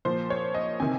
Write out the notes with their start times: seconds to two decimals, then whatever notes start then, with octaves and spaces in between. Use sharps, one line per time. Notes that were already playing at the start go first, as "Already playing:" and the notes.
0.05 A#2 F3 C5
0.30 C#5
0.55 D#5
0.80 C3 D#3 G#5